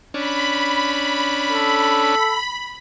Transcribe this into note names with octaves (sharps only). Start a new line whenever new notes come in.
C#4 D4 B5
A4